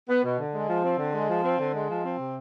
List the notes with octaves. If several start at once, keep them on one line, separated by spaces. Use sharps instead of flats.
B3
B2
D3
G#3
F3
C4
D3
G#3
F3
C4
D3
G#3
F3
C4
C3